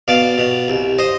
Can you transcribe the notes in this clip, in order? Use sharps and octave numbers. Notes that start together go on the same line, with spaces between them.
B2 D5 F5
B2
C2
C5 D#5